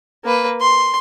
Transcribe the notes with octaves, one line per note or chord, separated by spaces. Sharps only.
A#3 B4
C6